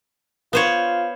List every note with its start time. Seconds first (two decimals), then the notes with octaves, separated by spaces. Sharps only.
0.53 B3 F4 C5 C#5